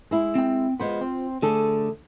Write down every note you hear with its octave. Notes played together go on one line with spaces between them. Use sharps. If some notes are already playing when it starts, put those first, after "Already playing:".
G#3 E4
C4 G5
G#3 B3 F4 C5
C4
D3 A3 G#4 A4